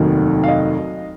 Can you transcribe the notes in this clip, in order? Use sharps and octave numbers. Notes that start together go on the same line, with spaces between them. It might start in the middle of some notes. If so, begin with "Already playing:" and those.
Already playing: F1 D#2 D#3 F#3
F5
D#5